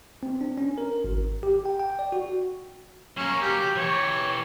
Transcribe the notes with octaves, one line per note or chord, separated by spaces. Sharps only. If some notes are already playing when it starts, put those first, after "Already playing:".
C4
D4
C#4
A#4
G#1
G4
G5
G5
D5
F#4
F#3 A#3 C#4
G4
E3 G4 C#5